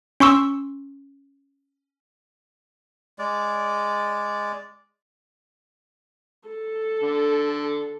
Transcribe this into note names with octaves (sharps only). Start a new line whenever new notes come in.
C#4 C6 C#6 E6
G#3 D5
A4
D3